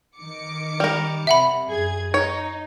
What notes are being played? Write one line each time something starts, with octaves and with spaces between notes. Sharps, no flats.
D#3 D6 C#7
G3 A#4
C3 E5 F#5 B5
F#2 G#4 G#6
D#4 C#5